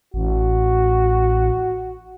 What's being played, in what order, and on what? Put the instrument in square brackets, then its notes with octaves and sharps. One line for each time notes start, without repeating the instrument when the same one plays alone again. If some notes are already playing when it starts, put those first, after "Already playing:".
[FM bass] A1 [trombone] F#4